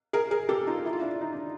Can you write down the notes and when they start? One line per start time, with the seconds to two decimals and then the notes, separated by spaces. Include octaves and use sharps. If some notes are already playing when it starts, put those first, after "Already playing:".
0.13 G#4 A#4
0.31 G#4 A#4
0.49 G4 A4
0.67 D#4 F4
0.86 E4
0.93 F4
1.01 D4 E4
1.21 D#4
1.33 D4